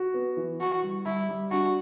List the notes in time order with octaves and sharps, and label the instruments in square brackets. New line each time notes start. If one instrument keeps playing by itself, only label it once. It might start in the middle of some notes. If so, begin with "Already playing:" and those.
Already playing: [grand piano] F#4
B3
E3
[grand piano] E3 [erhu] F#4
[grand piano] G3
[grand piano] G3 [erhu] E4
[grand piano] G3
[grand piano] D4 [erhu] F#4